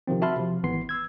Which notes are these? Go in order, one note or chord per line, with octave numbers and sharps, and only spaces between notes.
C3 D#3 F3 C4
F#4 E5 A5 B5 C6 F6
C3 F3
G#1 E3 B3 C6 C7
E6 G#6